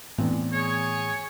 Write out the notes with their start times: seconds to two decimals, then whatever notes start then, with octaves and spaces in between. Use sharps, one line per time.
0.18 E2 A2 E3 B3 C4 D4
0.53 G#4 C#5 G#5